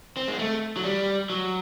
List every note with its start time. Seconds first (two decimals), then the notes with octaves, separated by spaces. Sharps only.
0.17 C4
0.28 G#3
0.39 A3
0.77 F#3
0.84 G3
1.30 F#3